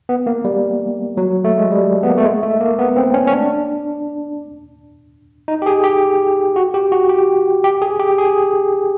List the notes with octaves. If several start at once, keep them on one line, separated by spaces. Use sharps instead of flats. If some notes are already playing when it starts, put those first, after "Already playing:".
B3
A#3
G3
F#3
A3
G#3
G3
B3
A#3
A3
G#3
A3
A#3
B3
C4
C#4
C#4
D4
D#4
G4
G#4
G4
F#4
G4
F#4
G4
G4
G#4
G4
G#4